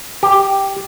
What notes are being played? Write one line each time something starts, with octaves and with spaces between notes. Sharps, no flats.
G4